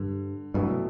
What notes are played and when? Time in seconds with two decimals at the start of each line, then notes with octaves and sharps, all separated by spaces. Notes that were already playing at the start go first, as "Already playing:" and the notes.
Already playing: G2 D3
0.54 C2 G2 B2 F#3 A3 E4